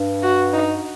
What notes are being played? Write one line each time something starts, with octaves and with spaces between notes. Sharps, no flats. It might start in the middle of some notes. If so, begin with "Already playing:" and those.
Already playing: G2
F#4
D#4